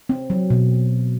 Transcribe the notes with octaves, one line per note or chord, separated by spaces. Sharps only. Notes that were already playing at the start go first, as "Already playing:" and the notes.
C4
F#3
B2